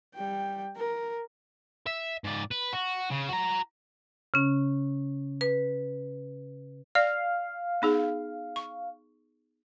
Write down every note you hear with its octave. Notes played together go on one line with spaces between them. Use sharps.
G3 G5
A#4
E5
G#2 D5
B4
F#4
C#3
F#4 A#5
C#3 C#4
B4
D5 F5
B3 D#4 G#4
C#6